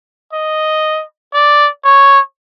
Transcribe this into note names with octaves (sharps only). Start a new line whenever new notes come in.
D#5
D5
C#5